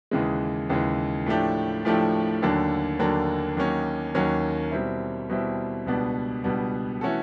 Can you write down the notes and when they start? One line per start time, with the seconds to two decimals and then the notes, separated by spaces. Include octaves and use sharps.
0.11 D#2 C#3 E3 G#3
0.70 D#2 C#3 E3 G#3
1.26 A2 F3 A3 D4 G4
1.85 A2 F3 A3 D4 G4
2.42 D#2 D3 F#3 A#3 D4
2.99 D#2 D3 F#3 A#3 D4
3.57 D#2 D#3 F#3 A#3 C#4
4.15 D#2 D#3 F#3 A#3 C#4
4.71 B2 G3 C4 E4
5.30 B2 G3 C4 E4
5.86 C#2 B2 G3 B3 D4
6.44 C#2 B2 G3 B3 D4
7.01 E3 A3 C#4 F#4 A4